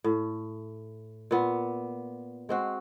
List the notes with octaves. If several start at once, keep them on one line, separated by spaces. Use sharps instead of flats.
A2
A#2 B3
G#3 C4 F#4